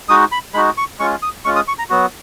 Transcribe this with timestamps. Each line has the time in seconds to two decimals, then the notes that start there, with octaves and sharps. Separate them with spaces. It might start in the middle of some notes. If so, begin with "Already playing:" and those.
0.09 G#3 D#4 F#4 D#6
0.32 B5
0.54 G#3 D#4 F#4 B5
0.77 C#6
0.99 G#3 C#4 F4 C#6
1.22 D#6
1.45 G#3 C#4 F4 C#6
1.56 D#6
1.68 C#6
1.79 A#5
1.90 F#3 B3 F#4